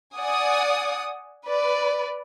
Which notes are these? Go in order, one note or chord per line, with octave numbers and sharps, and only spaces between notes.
D5 F#5 G#5 D#6
B4 D5